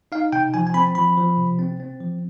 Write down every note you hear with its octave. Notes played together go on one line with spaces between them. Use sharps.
D#4 F5
C3 G5
F3 G#5
G#5
C4 B5
F3 B5
F3
C3
C4
C4
F3